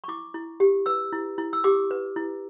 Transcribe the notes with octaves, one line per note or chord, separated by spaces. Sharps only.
C#6
E4 D6
E4
G4
B4 E6
E4
E4
E6
G4 D6
B4
E4